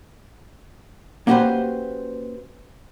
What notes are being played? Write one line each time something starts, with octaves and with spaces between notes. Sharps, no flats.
A#3 C#4 F#4 G4 B4 C5